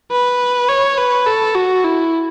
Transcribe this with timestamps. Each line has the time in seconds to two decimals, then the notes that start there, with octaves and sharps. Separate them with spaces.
0.12 B4
0.69 C#5
0.98 B4
1.27 A4
1.55 F#4
1.84 E4